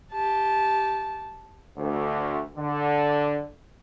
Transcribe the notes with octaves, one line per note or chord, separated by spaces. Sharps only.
G4 A5
D2
D3